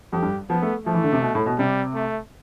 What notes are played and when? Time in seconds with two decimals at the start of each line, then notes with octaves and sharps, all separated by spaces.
0.13 F2 G4
0.22 G2
0.50 F3 B3
0.62 A3
0.86 F3 A3
0.94 E3
1.04 D3
1.12 C3
1.22 B2
1.35 A2
1.46 B2
1.58 C3 G3
1.95 A3